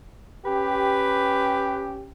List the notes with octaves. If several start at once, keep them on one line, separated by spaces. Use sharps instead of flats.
C#4 G4 B4